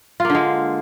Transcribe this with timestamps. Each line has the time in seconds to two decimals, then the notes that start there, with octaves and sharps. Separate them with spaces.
0.20 F4
0.25 A#3
0.30 D3
0.35 G#3